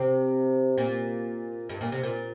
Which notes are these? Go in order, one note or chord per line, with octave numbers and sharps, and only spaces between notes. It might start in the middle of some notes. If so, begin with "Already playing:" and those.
Already playing: C3
A#2
G2
A#2
C3
A#2